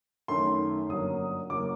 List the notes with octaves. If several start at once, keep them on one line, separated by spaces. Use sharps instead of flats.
F#2 D#3 A3 C6
G1 F#2 F#3 A#3 D#6
F#1 F#3 A#3 D6